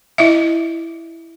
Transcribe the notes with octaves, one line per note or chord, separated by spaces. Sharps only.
E4 D#5 E5